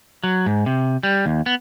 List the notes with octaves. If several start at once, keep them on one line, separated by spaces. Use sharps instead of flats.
F#3
G#2
C3
G3
D#2
B3